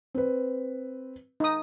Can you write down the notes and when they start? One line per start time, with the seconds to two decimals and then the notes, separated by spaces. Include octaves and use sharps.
0.14 C4 B4
1.40 D#4 D#6